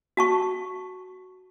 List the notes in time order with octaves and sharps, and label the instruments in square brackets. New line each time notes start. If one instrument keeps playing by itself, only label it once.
[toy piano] F#4 A5 C#6